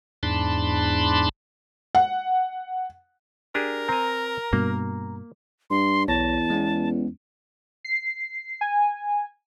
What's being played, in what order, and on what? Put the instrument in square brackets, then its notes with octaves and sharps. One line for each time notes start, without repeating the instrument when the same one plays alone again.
[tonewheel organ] E2 G#2 D4 A5 B5 C6
[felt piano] F#5
[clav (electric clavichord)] D4 G4 G#4 [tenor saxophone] A#4
[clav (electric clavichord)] C4 G#5 [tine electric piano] A#5
[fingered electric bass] G2 B2 [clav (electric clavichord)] A#3
[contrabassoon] G2 [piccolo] C6
[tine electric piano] B1 C#5 A#6 [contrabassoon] E2 [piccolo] A5
[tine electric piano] G#3 B3 C#4
[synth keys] C7
G#5